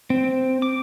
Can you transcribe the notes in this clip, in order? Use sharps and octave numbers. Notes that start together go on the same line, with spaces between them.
C4
D6